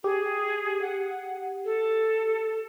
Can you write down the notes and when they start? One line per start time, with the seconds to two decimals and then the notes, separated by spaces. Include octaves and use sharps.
0.04 G4 G#4
0.82 F#5
1.65 A4